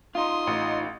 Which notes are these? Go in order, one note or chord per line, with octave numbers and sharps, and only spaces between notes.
D#4 F4 C6 D#6
A1